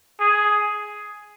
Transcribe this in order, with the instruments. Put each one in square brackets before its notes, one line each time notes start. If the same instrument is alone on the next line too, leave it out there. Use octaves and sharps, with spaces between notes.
[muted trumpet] G#4